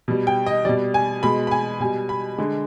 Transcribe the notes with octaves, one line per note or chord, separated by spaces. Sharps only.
B2 G3
G5
D#5
B2 G3 D5
G#5
B2 G#3 B5
B5
G#5
B2 G3 G#5
B5
D3 G#3